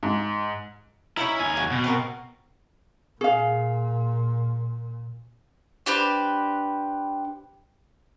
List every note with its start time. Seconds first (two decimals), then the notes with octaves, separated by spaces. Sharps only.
0.03 G#2
1.17 C#4 D#4 E4 A#5
1.40 D#2 G#5
1.57 F#3
1.71 B2
1.84 C4 F#4 A#4
3.21 A#2 G#4 F5
5.86 D4 G4 B4 C5